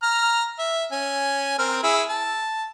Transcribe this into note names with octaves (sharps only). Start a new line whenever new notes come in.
A#5 F6
E5
C#4 G#5
C4 A#4 F6
E4 G#4 E6
A5